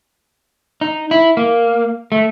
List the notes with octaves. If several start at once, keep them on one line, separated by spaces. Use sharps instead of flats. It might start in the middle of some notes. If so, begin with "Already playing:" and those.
D#4
E4
A#3
A3